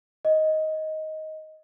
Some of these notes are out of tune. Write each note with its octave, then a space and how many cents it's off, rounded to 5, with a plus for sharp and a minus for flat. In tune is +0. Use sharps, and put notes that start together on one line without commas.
D#5 +10